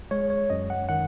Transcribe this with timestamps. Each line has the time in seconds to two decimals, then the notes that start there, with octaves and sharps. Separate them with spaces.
0.11 G#3 C#5
0.30 C#5
0.50 F#2 D#5
0.70 F#5
0.89 D#3 F#5